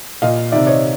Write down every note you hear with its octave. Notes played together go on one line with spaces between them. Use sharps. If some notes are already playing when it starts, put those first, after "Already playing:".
A#2 D#5 F5
C3 D#3 D5 E5
C#5 D#5